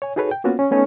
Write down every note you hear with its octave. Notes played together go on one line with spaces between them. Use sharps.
C#5 G#5
D#4 F#4 G#4 A4 B4 C#5
G5
A#3 B3 C#4 F4 F#4
C#4
A3 B3 C#4 D#4 A4